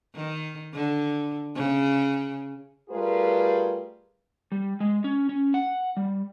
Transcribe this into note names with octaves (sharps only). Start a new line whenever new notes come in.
D#3
D3
C#3
G3 A3 F4 G#4 A#4 B4
G3
G#3
C#4
C#4
F#5
G3